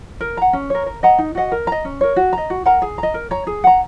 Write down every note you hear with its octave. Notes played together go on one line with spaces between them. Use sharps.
A#4
F#5 A#5
C#4
A#4 C#5
A#4
D#5 F#5 A#5
D#4
F#4 D#5 F#5
A#4
D#5 A#5
C#4
A#4 C#5
F#4
D#5 A#5
F#4
A#4 F#5 A#5
G#4
A#5
D#5
A#4
C#5 A#5
G#4
F#5 A#5